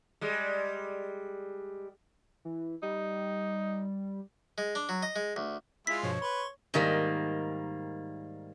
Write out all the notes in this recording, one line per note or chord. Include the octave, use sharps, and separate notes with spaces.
G3 G#3
E3
G3 D#4
G#3
D4
F#3
D#5
G#3
D2
G#3 E4 F4 B6
G2 B2 F3 C#5
B4 C6 C#6
G#2 D#3 G3 A#3